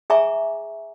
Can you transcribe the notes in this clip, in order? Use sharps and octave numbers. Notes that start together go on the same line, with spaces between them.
G#4 E5 G#5 A#5 C#6 D6